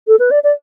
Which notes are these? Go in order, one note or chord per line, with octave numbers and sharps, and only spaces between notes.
A4
B4
D5
D5